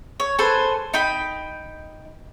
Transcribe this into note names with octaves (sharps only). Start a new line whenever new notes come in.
C#5
A4 B4 C5 G#5
D#4 G5 B5